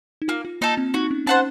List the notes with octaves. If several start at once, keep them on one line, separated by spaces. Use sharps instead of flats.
D#4
A#3 F4
F4
A#3 D#4 A4
C4
D#4 F#4
C#4
C#4 C5 F#5 A5